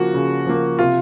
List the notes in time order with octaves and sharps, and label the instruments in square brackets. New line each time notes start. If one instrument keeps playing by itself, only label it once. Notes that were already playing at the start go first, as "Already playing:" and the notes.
Already playing: [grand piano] C#3 F3 A#3 F#4
C#3
F3 A#3
C3 F4